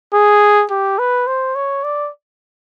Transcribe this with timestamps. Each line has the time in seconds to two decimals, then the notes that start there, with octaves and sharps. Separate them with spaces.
0.14 G#4
0.71 G4
0.99 B4
1.27 C5
1.55 C#5
1.84 D5